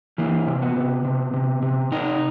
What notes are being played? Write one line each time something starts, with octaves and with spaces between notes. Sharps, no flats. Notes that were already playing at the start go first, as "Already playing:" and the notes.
E3 A#3
C3
B3
C3
C3
C3
C3
C3 D#4